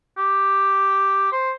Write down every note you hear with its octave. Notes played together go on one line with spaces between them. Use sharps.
G4
C5